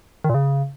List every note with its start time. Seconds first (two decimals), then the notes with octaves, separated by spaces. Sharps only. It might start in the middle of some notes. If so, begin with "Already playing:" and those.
0.24 D#3
0.29 A#2
0.35 C#3